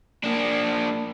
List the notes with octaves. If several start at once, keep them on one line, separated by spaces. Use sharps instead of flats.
A#3 D4